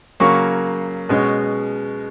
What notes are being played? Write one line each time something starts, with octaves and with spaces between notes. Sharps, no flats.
C#3 F#3 A#3 C#6
B2 G#3 C#4